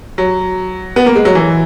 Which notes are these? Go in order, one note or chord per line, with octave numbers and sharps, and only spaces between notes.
F#3
B3
A#3
G#3
F#3
E3